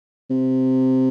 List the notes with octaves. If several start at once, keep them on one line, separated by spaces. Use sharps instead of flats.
C3